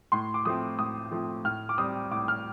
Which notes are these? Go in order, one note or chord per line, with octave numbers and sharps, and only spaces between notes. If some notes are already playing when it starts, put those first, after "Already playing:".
A2 C6
D6
F3 A3 C4 D#6
A2 D#6
F3 A3 C4
A2 F6
D6
G3 C4 D#6
A2 D6
F6